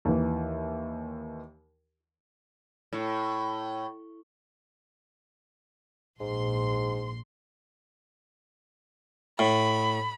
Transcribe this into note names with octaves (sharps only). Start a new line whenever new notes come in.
D#2 E3
A2
A#1 G#2 C6
A2 B5